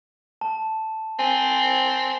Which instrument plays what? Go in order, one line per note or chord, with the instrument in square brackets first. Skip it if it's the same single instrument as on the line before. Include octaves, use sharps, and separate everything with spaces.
[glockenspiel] A5
[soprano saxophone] C4 [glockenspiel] G#5